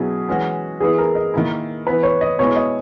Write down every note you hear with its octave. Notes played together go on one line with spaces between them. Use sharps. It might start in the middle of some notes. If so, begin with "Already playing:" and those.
Already playing: B2 F#3 C#4 E4 G#4
E3 G#3 C#4 F#4
E3 B3 E4 G#4
A#4
D#5
D#3 A#3 E4
E3 B3 E4 B4
C#5
D#5
B2 G#3 B3 E4 C#5
D#5